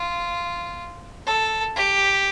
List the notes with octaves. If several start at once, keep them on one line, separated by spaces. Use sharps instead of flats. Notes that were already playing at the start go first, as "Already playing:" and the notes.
Already playing: F4
A4
G4